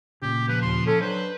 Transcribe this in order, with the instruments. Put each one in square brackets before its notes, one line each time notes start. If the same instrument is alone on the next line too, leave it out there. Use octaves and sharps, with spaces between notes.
[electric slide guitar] A#2 C#3 [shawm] G4
[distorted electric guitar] F3 [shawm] B4
[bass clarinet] D#2 [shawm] C6
[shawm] C#4 [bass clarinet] A4
[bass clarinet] F#3 [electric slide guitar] D4 [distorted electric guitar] B4 [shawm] C5